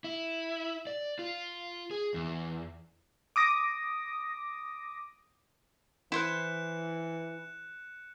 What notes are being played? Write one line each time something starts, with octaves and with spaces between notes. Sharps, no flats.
E4
D5
F4
G#4
E2
D6 D#6 A#6
E3 E4 C5 F#6 C#7 E7